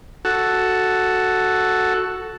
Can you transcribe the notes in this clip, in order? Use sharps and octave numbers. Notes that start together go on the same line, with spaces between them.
F#4 A4